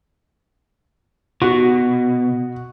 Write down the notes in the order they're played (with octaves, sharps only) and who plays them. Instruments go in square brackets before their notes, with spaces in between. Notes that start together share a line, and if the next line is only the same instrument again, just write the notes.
[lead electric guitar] B2 [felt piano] F#4